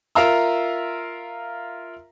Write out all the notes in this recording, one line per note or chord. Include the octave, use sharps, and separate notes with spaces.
F4 A#4 E5 F5 A#5 E6